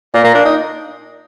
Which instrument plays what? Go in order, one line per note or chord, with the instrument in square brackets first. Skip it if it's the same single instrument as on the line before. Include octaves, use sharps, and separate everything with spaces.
[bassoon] A#2 [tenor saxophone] A#3
[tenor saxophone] A#3
D4
D#4